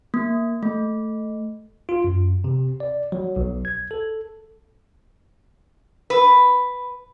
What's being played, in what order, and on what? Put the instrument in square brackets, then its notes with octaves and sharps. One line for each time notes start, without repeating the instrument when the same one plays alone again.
[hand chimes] A#3
A3
[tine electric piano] F4
F#2
C3
D5
F#3
B1
G#6
A4
[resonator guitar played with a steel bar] B4